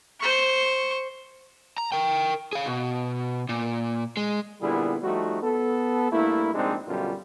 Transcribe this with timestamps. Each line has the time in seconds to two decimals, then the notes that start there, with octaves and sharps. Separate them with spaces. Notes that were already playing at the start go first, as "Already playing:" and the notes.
0.20 C5 C#6
1.78 A#5
1.92 A#4 G5
2.53 G#4 F5
2.66 B2
3.49 A#2
4.17 G#3
4.61 A#2 D3 G3 B3 E4 G#4
5.03 F3 G3 A3 D#4 F#4
5.43 B3 A4
6.12 G2 A3 A#3 E4
6.54 A#1 C3 G#3 C4 D4 D#4
6.88 F#2 B2 D3 G3 F4